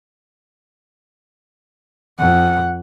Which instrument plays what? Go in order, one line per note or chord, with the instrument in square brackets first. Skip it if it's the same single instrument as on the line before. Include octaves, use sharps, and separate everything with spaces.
[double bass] F2 [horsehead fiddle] F#5